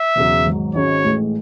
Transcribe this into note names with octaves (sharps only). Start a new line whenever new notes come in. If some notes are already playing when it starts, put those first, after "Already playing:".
Already playing: E5
E1 E2 C#3 F#3
G#1 G#2 F#3
G#1 G#2 G#3 C#4 F#4 C#5
A1 A2 G#3